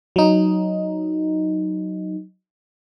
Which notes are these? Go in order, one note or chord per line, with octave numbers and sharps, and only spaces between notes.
F#3 D#4